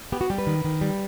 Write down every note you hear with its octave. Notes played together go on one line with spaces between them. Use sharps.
B3 G4
F#4
G3 G4
B4
D#3
D#3
G3